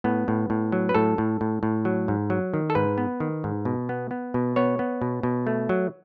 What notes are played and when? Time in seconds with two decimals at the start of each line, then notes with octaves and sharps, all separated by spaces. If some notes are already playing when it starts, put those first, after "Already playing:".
0.04 A2 B3
0.28 A2
0.50 A2
0.72 F#3
0.89 B4
0.95 A2 A4
1.18 A2
1.41 A2
1.63 A2
1.85 F#3
2.08 G#2
2.30 F#3
2.54 D#3
2.70 A4
2.75 G#2 B4
2.98 B3
3.20 D#3
3.44 G#2
3.65 B2
3.89 B3
4.11 B3
4.34 B2
4.56 B3 C#5
4.79 B3
5.02 B2
5.23 B2
5.47 A3
5.69 F#3